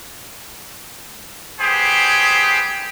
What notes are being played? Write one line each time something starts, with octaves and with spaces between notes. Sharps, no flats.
B3 G4 G#4 C5